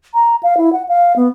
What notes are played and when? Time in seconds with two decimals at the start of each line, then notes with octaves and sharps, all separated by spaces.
0.14 A#5
0.43 F5
0.58 E4
0.73 F#5
0.88 F5
1.16 B3